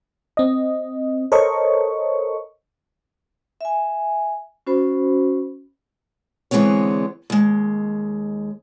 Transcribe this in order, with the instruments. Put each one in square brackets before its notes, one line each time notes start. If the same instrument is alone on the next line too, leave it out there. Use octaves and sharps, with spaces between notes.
[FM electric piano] C4 D#5
A4 A#4 C5 C#5 D#5 C#6
[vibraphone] E5 G#5
C#4 F#4 C5 B5
[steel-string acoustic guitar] D3 E3 G#3 B3 C4 C#5
D#2 G#3